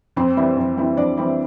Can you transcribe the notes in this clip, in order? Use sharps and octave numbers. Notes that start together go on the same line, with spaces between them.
F2 C4 C5
E3 G3 C4 E4
F2
E3 G3 C4 E4
F2 D4 D5
E3 G3 C4 E4